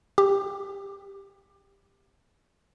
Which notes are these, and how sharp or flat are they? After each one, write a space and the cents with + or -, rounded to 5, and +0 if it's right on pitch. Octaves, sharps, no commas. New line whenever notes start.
G4 +15